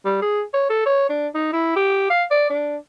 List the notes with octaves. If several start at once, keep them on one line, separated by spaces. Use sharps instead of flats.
G3
G#4
C#5
A4
C#5
D4
D#4
E4
G4
F5
D5
D4